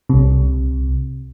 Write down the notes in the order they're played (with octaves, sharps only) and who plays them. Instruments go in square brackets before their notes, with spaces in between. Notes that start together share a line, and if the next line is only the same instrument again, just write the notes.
[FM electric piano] C2 C3